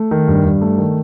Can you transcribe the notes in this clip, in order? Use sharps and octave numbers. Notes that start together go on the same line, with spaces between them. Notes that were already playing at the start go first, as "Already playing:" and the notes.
Already playing: A3
D#3
G2
G2
A3
D#3